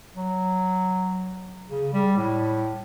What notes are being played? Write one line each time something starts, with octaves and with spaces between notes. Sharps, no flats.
F#3
C#3
G3
A2